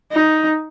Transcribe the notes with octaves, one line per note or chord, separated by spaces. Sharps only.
D#4